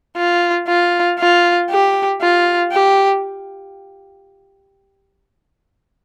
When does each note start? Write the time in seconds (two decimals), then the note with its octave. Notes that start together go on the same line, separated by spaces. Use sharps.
0.17 F4
0.67 F4
1.19 F4
1.70 G4
2.21 F4
2.72 G4